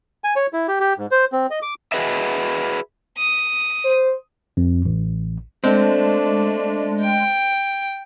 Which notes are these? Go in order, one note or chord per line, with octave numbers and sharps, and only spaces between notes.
G#5
C#5
E4
G4
G4
G#2
C5
C4
D#5
D6
F#4 G#4 B4 D#5 E5
D#6
C5
F2
A1
G#3 A3 C4 D4
G5